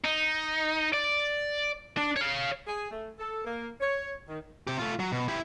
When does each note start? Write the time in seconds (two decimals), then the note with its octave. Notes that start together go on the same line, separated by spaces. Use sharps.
0.05 D#4
0.93 D5
1.97 D4
2.17 C#5 F5
2.67 G#4
2.90 A3
3.17 A4
3.44 A#3
3.80 C#5
4.27 D#3
4.67 C3 G4
4.79 A3 F4
4.99 F#3
5.12 B2
5.28 E4 G4